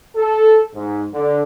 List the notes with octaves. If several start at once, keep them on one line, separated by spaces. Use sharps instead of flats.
A4
G#2
D3